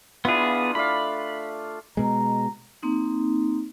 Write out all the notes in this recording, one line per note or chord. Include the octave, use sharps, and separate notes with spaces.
B3 D4 E4 F4 G#4
A3 D5 F5 B5
B2 G#3 A#5
A#3 C4 D#4